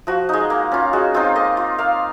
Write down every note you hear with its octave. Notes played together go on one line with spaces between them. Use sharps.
F3 F#4
G#3 D#4
A#3
C#4 F4
G#3 F#4
C4 D#4 F4
A#3 D#5
F4
A#3 F5